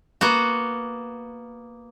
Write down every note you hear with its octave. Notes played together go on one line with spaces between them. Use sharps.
A#3 B3 F#4